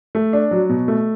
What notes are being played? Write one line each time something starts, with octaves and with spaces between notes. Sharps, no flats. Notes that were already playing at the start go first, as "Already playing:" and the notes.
A3
D4
F#3
B2
A3